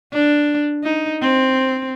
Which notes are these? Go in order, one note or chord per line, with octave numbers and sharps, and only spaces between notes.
D4
D#4
C4